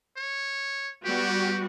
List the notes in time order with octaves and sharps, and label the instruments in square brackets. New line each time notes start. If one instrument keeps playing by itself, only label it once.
[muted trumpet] C#5
[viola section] G3 B3 F#4 [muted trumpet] G4